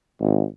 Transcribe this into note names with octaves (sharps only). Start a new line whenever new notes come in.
G#1